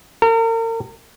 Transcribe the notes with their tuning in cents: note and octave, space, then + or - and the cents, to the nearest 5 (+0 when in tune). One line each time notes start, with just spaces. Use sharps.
A#4 -40